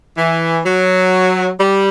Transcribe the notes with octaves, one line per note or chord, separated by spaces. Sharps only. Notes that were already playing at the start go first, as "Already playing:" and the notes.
E3
F#3
G3